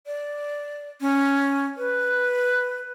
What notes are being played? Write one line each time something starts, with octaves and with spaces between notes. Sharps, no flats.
D5
C#4
B4